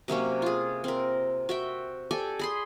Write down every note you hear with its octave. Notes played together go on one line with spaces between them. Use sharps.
C3 F#3 A#3 C#4
F4 G#4
C4 A#4
F#4 E5 G5
G4 A4 D5 G#5
G#4 B5 C6